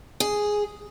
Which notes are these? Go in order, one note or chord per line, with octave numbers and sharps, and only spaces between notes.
G#4